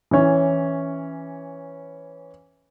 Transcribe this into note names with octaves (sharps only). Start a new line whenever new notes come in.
E3 C#4